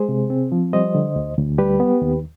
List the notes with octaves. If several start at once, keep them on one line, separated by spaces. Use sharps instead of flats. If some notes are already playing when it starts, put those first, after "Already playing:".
Already playing: G#3 G#4 C5
C3
C4
F3
G3 C5 D#5
D3
D2
D2
G3 G4 B4
B3
D#2